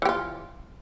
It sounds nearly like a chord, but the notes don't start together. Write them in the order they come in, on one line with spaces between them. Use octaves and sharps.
E3 G4 F4